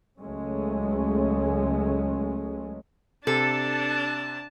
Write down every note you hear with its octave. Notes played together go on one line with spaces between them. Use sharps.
C#2 F#3 G#3 A3 C#4
C3 D4 A4 A5